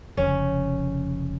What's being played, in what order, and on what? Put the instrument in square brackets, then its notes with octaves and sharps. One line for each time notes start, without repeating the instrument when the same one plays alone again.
[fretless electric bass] F1 F2 C#3 [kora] C#4